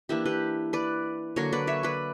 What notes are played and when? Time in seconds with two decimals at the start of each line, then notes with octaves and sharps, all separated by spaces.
0.09 E3 A#3 D4 E4 G4
0.25 G4 B4
0.73 B4 D5
1.36 D3 F#3 A#3 A#4 C#5
1.53 B4 D5
1.67 C#5 E5
1.83 B4 D5